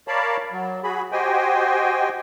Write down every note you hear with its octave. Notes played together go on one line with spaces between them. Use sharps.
A#4 C#5 D5 F5 A5 B5
F#3
F#4 G#4 B5
F#4 G4 C5 D#5 G5 G#5